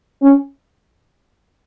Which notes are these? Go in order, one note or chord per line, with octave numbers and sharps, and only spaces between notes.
C#4